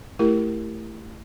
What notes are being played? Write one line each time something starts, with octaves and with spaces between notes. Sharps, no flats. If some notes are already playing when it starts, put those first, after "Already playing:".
A3 E4 G4 A#4